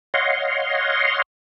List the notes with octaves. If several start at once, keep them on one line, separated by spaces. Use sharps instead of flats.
C#5 D#5 F5 F#5 C6